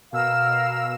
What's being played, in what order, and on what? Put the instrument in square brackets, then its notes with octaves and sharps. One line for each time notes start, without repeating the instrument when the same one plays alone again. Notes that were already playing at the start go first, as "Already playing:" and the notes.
[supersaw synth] B2 E6 E7 [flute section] A#4 F5 F6